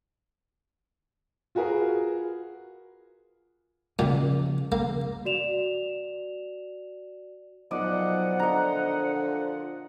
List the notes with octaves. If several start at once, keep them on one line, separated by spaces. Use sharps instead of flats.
F4 F#4 G#4 A#4 B4
A#2 C#3 F3
C#3 A#3
F#4 D5 E7 F7
B1 A#2 F3 D5 D#5 F#5
D3 D#5 A#5